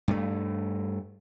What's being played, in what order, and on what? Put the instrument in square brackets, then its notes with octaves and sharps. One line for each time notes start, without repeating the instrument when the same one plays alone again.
[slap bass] G2 A3